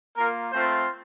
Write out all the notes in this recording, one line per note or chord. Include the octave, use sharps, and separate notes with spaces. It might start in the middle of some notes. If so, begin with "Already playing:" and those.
A#3 F4 A#4
A3 C4 F4 C5